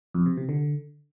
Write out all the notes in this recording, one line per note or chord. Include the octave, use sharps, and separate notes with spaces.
F2
C3
C3
D3